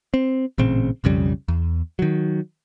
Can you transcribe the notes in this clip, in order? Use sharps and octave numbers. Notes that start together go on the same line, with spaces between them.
C4
A1 A#2 C#3 C4
B1 F2 C#3 G3
E2
D#3 F#3